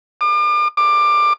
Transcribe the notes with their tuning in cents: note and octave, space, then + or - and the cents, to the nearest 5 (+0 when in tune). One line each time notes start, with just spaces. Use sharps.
D6 +40
D6 +20